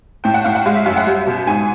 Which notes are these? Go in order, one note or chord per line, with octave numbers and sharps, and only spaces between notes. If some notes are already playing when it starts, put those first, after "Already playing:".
A2 G5
F#5
A2 F5
F#5
G#3 F5
E5
F#2 F5
F#5
G3
B2
G#2 G#5